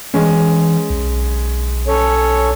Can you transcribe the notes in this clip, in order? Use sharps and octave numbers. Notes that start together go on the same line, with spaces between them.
E3 G#3 C#4
B1
C#4 A4 C#5